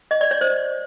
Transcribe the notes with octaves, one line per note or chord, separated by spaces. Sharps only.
D#5
D5
C#5
C5